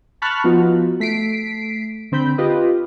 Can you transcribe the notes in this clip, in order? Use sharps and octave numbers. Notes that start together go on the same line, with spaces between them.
A5 B5 C#6 F6 F#6
F3 B3 D#4 F4 F#4
A3 B6 C7 D7
D3 C4 B5 G6
F4 G4 B4 D#5